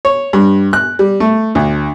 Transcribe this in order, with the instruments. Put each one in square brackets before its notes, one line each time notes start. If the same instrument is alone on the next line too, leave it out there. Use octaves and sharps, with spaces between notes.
[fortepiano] C#5
G2
F#6
G3
A3
D2